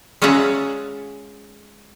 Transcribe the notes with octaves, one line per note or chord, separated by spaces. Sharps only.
G#3 C#4 F4 E5 F#5 A#5